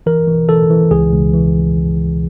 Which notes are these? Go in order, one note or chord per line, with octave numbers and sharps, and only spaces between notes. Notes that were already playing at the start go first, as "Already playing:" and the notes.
E3 A#4
E3
E3 A4
E3
C#2 G#4
C#2
E3